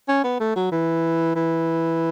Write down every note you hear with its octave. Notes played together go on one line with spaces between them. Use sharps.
C#4
B3
A3
F#3
E3
E3